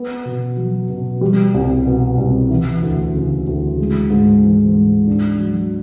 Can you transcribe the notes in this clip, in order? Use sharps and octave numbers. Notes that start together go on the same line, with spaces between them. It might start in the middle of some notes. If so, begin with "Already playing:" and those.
Already playing: B3
B2
F#3
B2
G3
C2
B2
C2
E3
D2
C#3
D2
G#3
G#2
E3
G#2
D4
F#3